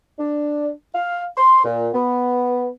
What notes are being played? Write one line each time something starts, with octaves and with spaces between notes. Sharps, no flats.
D4
F5
C6
A#2
B3